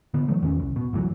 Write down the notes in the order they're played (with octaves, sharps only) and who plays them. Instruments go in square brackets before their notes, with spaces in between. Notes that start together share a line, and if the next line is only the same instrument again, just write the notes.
[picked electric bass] D3 B3
E3 F#3 A3
E2 D#3 E3 C#4
C2
B2
G1 D2 E3 F#3